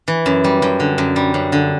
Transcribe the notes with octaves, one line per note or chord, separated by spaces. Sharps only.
E3
F#2
G3
F#2
D3
F#2
G3
F#2
D3